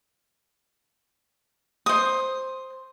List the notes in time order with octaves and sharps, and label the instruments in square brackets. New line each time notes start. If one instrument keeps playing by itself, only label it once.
[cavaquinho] C5 D#6